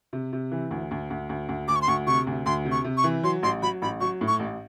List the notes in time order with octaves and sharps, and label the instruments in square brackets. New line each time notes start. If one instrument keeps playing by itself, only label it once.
[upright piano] C3
C3
E3
D2
D2
D2
D2
D2
[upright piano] D2 [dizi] D6
[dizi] C#6
C6
[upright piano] D2 [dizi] C#6
[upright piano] C3 [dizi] C#6
[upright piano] D2
[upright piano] D2 [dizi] C6
[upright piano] C3
[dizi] C#6
[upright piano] C3
[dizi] C#6
[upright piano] E3
[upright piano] F#3 [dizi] C6
[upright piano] A1 [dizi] C6
[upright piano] F#3 [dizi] B5
[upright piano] A1 [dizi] B5
[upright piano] F#3 [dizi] C#6
[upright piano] A2
[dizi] C#6
[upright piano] A1